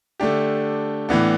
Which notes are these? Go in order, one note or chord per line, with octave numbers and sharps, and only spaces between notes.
D3 A3 D4 G4
A2 E3 B3 D4